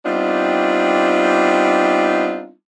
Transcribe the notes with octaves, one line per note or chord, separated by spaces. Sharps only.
G3 B3 C4 D4 D#4 F4